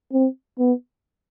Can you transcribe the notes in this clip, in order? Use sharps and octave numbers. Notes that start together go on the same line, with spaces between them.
C4
B3